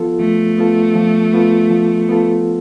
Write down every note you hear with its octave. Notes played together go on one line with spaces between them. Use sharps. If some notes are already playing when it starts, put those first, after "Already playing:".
Already playing: F3 B3 F4 A4
F3 A3
B3 F4 A4
F3
B3 F4 A4
F3
B3 F4 A4